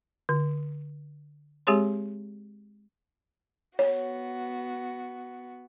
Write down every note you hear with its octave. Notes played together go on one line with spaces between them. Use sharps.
D3
G#3 C4 G4 G#4 C#5 C6
B3 F#4 C#5